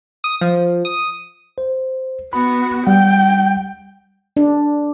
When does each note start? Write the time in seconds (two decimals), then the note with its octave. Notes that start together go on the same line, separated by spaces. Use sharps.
0.24 D#6
0.41 F3
0.85 D#6
1.58 C5
2.33 B3 F#4 B5
2.87 G3 F#5 G5
4.37 D4